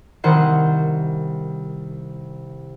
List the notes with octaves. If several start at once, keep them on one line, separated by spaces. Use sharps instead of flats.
C2 D#3 C5 F#5 C7